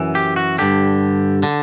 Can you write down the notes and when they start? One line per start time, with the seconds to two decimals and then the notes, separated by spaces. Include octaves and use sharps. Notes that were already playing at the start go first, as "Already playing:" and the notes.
Already playing: F#2 E3
0.15 G4
0.36 F#4
0.58 G2 D3 G4
1.43 D3